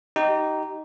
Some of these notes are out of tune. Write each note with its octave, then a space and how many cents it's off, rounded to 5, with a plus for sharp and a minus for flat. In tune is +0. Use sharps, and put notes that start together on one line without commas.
D#4 +0 G4 -25